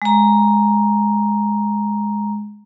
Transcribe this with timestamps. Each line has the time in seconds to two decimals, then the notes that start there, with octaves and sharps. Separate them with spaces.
0.02 G#3 A#5